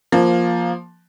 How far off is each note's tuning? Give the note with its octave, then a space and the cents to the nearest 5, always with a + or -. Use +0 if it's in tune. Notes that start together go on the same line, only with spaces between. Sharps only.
F3 +0 A#3 +10